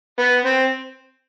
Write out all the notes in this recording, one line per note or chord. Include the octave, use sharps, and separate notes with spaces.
B3
C4